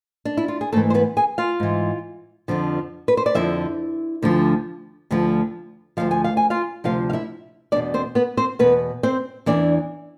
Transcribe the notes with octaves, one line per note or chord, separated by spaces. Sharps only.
D4
E4
F4
G#4
G#2 E3 A3 A4
C5
B3 B4
G#4 G#5
F4 F5
G#2 E3
F2 D3 F3
B4
C5
D5
F2 D3 F3 E4 E5
D2 D3 F3
D2 D3 F3
D2 C3 F3 F5
G#5
F5
G#5
F4 F5
D2 C3 F3 F4 F5
F5
E4 E5
E2 B2 D4 D5
C4 C5
B3 B4
C4 C5
E2 B2 B3 B4
C4 C5
E2 C3 E3 D4 D5